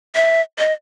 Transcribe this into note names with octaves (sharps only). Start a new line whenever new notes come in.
E5
D#5